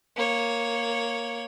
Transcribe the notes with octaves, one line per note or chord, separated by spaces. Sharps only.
A#3 C#5